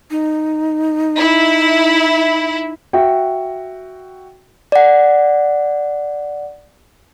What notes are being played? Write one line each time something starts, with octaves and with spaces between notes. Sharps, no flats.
D#4
E4
F#4 E5 G5
D5 F#5